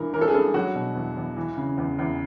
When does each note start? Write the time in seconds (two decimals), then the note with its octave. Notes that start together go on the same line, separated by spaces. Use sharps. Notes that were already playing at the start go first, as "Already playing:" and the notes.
Already playing: G2 E3 A#4
0.14 E3 A#4
0.21 A4
0.28 G#4
0.34 G2 A4
0.54 F#3 F#4
0.75 B2
0.95 E2
1.17 E2
1.36 E3
1.57 C#3
1.77 E2
1.98 E2